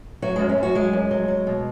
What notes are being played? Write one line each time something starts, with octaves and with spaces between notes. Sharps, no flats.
F#3 F#4
F#2 G#3
C#4
F#2 F#4
F#3 G#3
F#2
F#3
F#3
B2